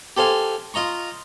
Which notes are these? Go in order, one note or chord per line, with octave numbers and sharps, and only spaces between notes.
G4 A4 C5 F5 G#5
F4 D#5 A#5 C#6